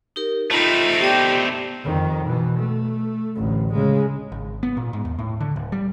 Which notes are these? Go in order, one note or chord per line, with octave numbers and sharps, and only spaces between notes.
D#4 G4 A#4
A3 C4 D#4 F4 B5
B3 G4 D5
F2 D#3
B2 E3
A3
A1 D2
C#3 G#3
G#1
B3
A#2
G#2
D#2
A2
D3
D1
G3